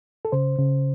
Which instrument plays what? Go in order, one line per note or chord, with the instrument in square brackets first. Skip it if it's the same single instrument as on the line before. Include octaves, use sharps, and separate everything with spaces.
[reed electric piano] A4
C#3 C5
C#3